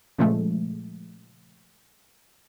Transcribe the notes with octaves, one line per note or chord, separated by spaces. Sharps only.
A#2 C#3 F3 G#3 A3